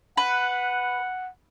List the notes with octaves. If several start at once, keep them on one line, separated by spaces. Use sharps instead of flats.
B4 F#5